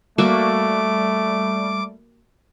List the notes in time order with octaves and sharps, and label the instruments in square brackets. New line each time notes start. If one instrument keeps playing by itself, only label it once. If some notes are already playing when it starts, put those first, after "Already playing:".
[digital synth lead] G3 [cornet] A3 [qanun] A#3 F#4 E5 [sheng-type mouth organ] D6